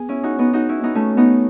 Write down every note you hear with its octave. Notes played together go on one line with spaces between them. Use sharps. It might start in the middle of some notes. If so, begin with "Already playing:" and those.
Already playing: B3 G#4
C#4 E4
D#4 F#4
B3 D#4
D#4 F#4
C#4 E4
B3 D#4
A3 C#4
B3 D#4